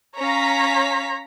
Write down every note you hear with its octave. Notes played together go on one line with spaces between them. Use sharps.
C#4 C#5 F5 A#5 B6